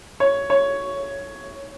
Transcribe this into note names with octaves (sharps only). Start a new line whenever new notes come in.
C#5
C#5